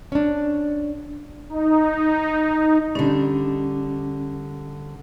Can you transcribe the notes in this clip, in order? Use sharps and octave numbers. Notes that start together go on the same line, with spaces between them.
C#4 D4
D#4
D3 G3 C#4